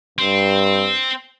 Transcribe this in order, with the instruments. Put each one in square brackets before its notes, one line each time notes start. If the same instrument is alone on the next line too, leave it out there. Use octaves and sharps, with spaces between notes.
[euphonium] G2 [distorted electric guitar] C4